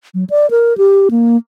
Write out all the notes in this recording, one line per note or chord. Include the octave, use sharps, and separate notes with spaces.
F#3
D5
A#4
G4
A#3